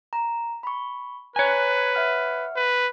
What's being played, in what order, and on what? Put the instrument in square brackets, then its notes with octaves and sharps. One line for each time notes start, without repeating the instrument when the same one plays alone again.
[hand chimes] A#5
B5 C#6
[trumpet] B4 [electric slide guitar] C#5 G#5 [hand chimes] A#5 F#6 G#6
[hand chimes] E5 F#5 F6
[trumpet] B4